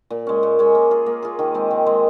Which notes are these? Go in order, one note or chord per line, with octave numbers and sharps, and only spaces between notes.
A#2
G#3 C#4
A#2
G#3 C#4
A#3
F4 G#4
A#3
F4 G#4
D#3
G#3 C4
D#3
G#3 C4